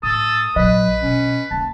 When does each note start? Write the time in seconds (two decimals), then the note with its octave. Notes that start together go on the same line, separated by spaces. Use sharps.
0.03 A2 A4 D#6
0.56 A#1 F#3 B4 D#5
1.02 B2 C#4
1.51 A#3 C#4 A5